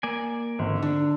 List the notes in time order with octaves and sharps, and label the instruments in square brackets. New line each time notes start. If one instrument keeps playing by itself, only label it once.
[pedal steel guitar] A#3 D5 G#5
[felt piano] G#1 [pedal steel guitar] D3
[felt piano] D4